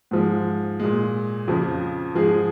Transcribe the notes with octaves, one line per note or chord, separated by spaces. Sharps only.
G#2 F3 G#3
A#2 G#3
F2 C#3 F3
G#2 F3 G#3 G#4